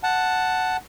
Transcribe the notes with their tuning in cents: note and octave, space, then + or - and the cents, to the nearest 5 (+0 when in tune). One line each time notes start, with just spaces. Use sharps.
F#5 +0 A5 +0